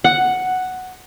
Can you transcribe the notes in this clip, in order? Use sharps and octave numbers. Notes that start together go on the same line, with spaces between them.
F#5